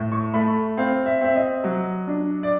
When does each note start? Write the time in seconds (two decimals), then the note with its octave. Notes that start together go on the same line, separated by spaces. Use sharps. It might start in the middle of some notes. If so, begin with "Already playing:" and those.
Already playing: A2
0.12 C#6
0.34 A3 B5
0.77 C4 F5
1.06 E5
1.21 C4 E5
1.36 D#5
1.64 F#3
2.07 D4
2.43 D5